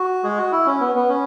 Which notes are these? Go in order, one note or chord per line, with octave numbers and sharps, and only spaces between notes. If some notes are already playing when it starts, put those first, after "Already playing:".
Already playing: F#4
G#3 G#4
F#4
E4
C#4
B3
B3
C#4